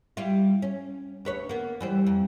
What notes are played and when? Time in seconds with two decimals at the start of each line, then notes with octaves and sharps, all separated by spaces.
0.17 G3 E4 F4
0.62 C#4
1.25 D2 B4 C#5
1.49 A#3 B3
1.81 E3 G3 C5
2.06 F2